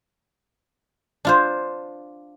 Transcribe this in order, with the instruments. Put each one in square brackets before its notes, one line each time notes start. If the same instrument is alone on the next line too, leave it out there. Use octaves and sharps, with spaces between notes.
[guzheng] D4 F4 C5